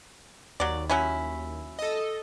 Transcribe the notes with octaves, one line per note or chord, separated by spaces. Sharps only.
D#2 F#3 D5
F#3 C#4 E4
A4 D#5